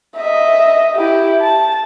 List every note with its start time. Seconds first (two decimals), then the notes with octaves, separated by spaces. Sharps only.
0.16 D#5 E5
0.95 E4 G4
1.41 A5